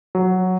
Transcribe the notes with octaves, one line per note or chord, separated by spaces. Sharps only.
F#3